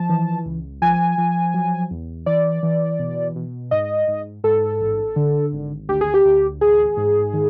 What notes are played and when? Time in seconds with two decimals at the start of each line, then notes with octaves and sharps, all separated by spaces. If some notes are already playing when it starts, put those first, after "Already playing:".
Already playing: F3 A5
0.09 E3
0.46 C#2
0.82 F3 G#5
1.18 F3
1.54 F#3
1.91 E2
2.26 E3 D5
2.63 E3
2.99 B2
3.35 B2
3.71 G#2 D#5
4.08 G#2
4.44 G#2 A4
4.80 A1
5.16 D3
5.53 G#1
5.89 D2 G4
6.01 G#4
6.14 G4
6.25 D2
6.61 A1 G#4
6.97 G#2
7.33 D#3